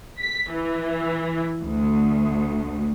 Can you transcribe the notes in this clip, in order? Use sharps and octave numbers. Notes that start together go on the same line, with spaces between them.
B6
E3
D2